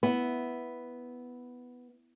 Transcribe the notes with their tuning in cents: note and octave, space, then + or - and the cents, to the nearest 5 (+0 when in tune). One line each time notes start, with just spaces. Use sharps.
B3 +0 E4 +0